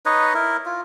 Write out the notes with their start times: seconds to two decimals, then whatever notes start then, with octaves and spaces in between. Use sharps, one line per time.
0.06 D#4 B4 C#5 D#5
0.34 E4 A#4
0.66 F4